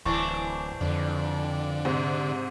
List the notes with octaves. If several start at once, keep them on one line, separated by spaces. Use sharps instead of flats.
D1 E3 C4 D4 C#6
F2 D3
G#2 C3